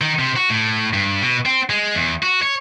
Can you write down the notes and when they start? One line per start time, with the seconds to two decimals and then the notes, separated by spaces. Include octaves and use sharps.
0.01 D#3
0.19 C3
0.36 F#4
0.49 A2
0.93 G2
1.22 B2
1.46 C4
1.70 G#3
1.95 E2
2.23 F#4
2.42 C#5